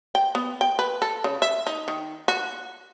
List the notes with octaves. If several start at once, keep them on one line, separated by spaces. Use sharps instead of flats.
G5
B3
G5
B4
A4
C#3
E5
D#4
D#3
F#4